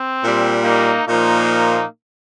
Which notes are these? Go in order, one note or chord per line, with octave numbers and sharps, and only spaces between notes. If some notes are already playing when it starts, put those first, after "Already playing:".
Already playing: C4
A#2 G3
A#3 D#4
A#2 F3 A#3 D#4